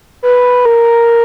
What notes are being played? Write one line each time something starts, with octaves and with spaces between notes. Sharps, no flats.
B4
A#4